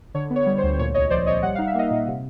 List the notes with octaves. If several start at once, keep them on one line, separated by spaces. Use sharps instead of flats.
D3 C#5
B3
C#5
G3
C5
D2
A#2 C#5
C2 C#5 D#5
F3 C5 D5
C2 C#5 D#5
G3 F#5
D#4 F5
E5
A#3 D#5 F5
A#2
C3